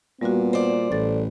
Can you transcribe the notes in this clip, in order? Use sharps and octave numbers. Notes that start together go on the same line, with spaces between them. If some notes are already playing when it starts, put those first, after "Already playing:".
A#2 G3 B3 F#4
C5 D5
A1 A2 A4 A6